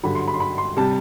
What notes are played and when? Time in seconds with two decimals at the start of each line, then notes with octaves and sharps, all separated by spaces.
0.03 G2 D3 F#3 B5
0.15 C6
0.28 B5
0.34 C6
0.40 B5
0.58 C6
0.77 C3 G3 A5